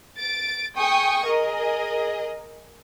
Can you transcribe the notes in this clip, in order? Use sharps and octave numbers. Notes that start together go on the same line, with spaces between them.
A6 D7
G#4 G5 G#5 C#6 D#6
G#4 A#4 D#5